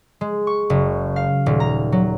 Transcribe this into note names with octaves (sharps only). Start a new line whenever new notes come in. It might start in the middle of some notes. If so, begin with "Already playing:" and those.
G#3
C#6
F#1
F5
D#1
A#5
F#3